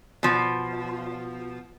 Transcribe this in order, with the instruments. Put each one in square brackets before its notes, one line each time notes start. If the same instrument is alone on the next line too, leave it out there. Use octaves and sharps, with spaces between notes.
[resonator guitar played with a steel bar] B2 F3